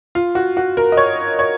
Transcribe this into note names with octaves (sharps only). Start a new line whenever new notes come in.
F4
F#4
F#4
A#4
D#5
C#5
C#5